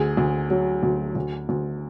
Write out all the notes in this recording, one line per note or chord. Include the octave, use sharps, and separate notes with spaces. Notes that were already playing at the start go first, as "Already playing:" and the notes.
Already playing: D2 G#4
D2
F#3
D2
D2
D2